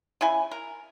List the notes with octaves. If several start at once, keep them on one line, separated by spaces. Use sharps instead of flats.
C#3 E4 G#5
A#4